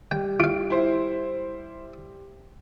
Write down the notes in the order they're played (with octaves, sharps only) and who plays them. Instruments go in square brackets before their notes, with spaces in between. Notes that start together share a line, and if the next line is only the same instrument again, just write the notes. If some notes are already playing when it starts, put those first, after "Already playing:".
[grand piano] G3 [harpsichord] G5
[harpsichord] F4 F5 [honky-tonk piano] D7
[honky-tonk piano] E4 C5